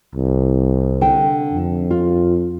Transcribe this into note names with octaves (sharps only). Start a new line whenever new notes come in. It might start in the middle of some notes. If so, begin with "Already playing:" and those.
C2
D3 G5
F2
F4